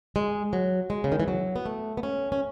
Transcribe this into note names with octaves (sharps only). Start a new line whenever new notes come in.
G#3
F#3
G#3
C#3
D#3
E3
F#3
B3
A3
B3
C#4
C#4